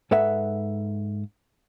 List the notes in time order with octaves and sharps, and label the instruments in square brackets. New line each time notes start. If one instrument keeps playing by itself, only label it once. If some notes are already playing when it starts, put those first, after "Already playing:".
[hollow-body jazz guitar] G#2 A4 B4 E5 F#5